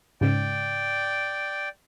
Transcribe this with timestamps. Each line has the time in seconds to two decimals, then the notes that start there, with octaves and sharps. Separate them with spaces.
0.21 G#2 C#3 D5 G5